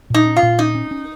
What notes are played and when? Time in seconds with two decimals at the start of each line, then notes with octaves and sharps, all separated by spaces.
0.10 A#2 D#4
0.26 C#4
0.37 F4
0.43 A#2
0.59 C#4 D#4
0.75 C#4
0.91 C#4